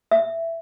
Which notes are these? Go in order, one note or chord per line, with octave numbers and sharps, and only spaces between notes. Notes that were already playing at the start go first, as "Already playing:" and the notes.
E5